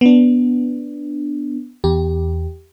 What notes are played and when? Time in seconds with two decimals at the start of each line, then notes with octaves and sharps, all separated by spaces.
0.01 B3 D4
1.84 E2 G4